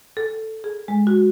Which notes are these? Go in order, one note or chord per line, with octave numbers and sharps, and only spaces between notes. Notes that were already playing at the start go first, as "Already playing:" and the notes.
A4
G#4
G#3
F#4